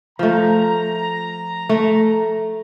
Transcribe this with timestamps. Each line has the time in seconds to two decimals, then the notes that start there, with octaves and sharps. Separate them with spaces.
0.19 F3 A3 A#5
1.69 A3